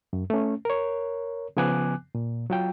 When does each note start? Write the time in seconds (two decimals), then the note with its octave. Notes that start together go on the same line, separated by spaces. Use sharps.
0.13 F#2
0.30 A3 C#4
0.65 A#4 C#5
1.57 C#3 F3 B3 G#5 D6 F#6
2.15 A#2
2.50 F#3 F4 G5